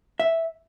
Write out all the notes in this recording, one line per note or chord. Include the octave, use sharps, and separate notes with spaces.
E5